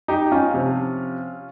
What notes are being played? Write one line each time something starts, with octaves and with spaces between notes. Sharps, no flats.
D#4 G4
C#4 F4
C3 F3